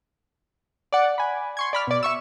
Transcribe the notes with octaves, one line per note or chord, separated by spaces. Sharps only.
D5 F#5
G#5 B5
C6 C#6 G#6
D5 B5 F6
B2 D5
E5 C#6 E6